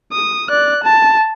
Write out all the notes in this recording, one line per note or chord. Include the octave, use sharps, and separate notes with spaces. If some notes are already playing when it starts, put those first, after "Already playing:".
D#6
D5 F#6
A5